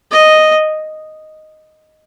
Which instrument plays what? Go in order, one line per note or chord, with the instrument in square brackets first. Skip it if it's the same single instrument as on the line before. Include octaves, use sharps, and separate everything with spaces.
[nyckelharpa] D#5